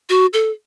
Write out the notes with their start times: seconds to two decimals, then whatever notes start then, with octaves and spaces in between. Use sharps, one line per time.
0.09 F#4
0.33 A4